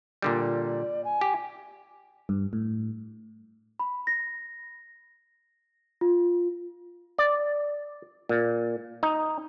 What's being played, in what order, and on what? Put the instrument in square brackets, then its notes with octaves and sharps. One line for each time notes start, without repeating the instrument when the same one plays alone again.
[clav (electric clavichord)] A#2 D3 G3
[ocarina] D5
D5
G#5
[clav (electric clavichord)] G4
[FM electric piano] G2
A2
[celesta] B5
A#6
F4
[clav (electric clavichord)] D5
A#2
D#4